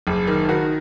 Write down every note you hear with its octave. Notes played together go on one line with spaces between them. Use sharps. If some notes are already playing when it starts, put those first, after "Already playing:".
F#1
D#3
D#3 F#4